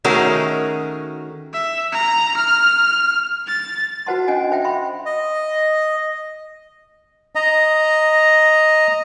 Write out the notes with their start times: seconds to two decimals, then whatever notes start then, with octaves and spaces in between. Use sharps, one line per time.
0.04 D#3 A3 C#4 F#4 G#4 A#4
1.53 E5
1.92 A#5
2.37 F6
3.47 A6
4.06 F#4 B4 C5 F#5 A5 C6
4.28 C#4 D4 D#5 F#5 G#5
4.52 C5 E5 G5
4.64 E5 B5 C6
5.06 D#5
7.35 D#5 A#5